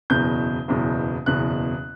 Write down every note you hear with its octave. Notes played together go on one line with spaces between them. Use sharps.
F#1 E2 B2 G6
F#1 E2 B2
F#1 E2 B2 F#6